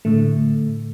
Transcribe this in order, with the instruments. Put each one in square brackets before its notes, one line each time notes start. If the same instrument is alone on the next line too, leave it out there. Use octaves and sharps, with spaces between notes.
[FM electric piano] A2 D3 A3